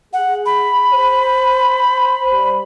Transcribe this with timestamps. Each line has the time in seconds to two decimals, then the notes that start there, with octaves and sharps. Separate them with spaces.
0.13 G#4 F#5
0.46 B5
0.93 C5
2.32 G3